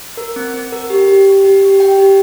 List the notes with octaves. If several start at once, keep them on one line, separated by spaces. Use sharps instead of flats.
A#4
C4
C4
A#4
G4
G4
G4
G4
G4
G5
G4